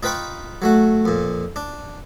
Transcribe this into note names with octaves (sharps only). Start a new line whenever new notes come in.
D#4 F4 B4 G5 B5 C#6
F#3 A3 F#4
F2 A#2
D4